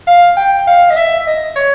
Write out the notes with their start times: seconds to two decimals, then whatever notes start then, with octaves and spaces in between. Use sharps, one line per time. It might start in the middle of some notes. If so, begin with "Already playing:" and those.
0.07 F5
0.37 G5
0.67 F5
0.90 D#5
0.97 E5
1.27 D#5
1.56 C#5